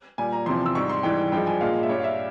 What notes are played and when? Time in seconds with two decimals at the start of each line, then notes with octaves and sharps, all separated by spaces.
0.18 A#2 G3 G#5
0.33 A#5
0.46 E2 C3 F3 C6
0.66 E6
0.75 G#2 G3 C#6
0.89 C6
1.03 G#2 E3 G3 G5
1.32 G2 F3 G#3 G5
1.47 G#5
1.61 A#2 F3 G#3 F5
1.83 E5
1.89 G2 G3 C#5
2.00 F5
2.04 E5